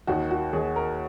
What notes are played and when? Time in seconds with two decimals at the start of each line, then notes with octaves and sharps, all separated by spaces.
0.07 D#2 D#3 F#4
0.31 F#4
0.53 D#2 D#3 G#4
0.76 A#4